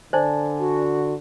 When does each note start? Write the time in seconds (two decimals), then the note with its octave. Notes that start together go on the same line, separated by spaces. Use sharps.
0.13 D3 C5 D5 G#5 A5
0.59 F#4